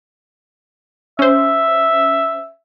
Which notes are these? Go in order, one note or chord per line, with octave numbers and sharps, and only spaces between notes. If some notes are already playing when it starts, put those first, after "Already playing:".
C#4 C5 E5